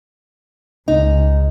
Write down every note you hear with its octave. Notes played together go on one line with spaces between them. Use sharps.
C#2 D#4